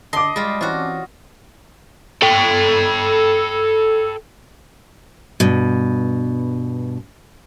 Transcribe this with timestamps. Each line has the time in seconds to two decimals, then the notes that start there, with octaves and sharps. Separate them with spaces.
0.13 D3 D#5 A5 C6 D6
0.36 G3 G#3 F4
0.61 E3 C4 C#4 F4 F#4
2.22 A4 G5
5.40 G2 B2